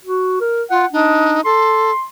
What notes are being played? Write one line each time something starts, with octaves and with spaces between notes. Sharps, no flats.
F#4
A#4
F4 F#5
D4 D#4
A4 C6